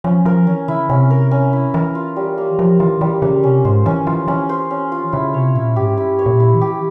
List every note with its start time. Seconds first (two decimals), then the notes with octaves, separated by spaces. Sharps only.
0.04 F3 C#4
0.25 F3 A#4
0.46 E3 C#4
0.68 C#3 E4
0.89 C3 C#4
1.10 A#4
1.31 C#4
1.53 E4
1.74 E3 A#4
1.95 F4
2.16 G3
2.38 A#3
2.59 F3 A#4
2.80 E3 F4
3.01 E3 G3
3.22 C#3 A#3
3.43 C3 C#4
3.65 G#2 C5
3.86 E3 C#4
4.07 E3 F4
4.28 E3 C#4
4.49 C5
4.71 C#4
4.92 F4
5.12 C#3 E4
5.34 C3 C#5
5.55 A#2 E4
5.76 G#2 G4
5.97 G2 E4
6.19 C#5
6.26 A#2
6.40 E4
6.54 E3
6.61 G4